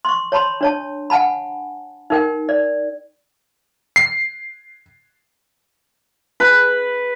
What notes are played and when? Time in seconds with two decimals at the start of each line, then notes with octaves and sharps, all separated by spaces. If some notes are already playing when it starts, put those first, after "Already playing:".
0.05 C6 C#6
0.32 C#5 A5 B5 C6
0.61 D4 C#5 A5
1.10 F#5 G#5 A5 B5
2.10 D#4 A#4 G5
2.49 D5
3.96 C7
6.40 B4